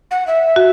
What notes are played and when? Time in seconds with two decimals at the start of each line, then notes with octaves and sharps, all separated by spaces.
0.11 F#5
0.27 E5
0.56 F#4